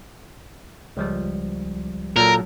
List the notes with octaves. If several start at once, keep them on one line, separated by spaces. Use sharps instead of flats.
C#2 F3 G3
A#2 F#3 A4 A#4